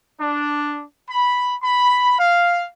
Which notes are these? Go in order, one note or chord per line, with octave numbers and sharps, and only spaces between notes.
D4
B5
B5
F5